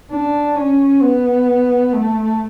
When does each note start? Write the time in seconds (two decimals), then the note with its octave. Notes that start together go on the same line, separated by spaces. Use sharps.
0.12 D4
0.56 C#4
1.02 B3
1.93 A3